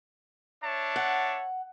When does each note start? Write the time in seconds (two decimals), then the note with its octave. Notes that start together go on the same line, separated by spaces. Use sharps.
0.63 D4 C#5 E5 A5
0.96 F#5